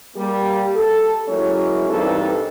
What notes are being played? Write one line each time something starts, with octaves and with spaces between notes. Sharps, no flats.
G3 A#3 G4
A4
F#3 G#3 A#3 C#4 E4
G2 E3 A#3 C4 D#4 A4